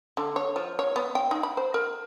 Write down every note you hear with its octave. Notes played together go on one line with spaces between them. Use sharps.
D3
C#5
F3
C#5
B3
G5
D#4
B5
C5
A#4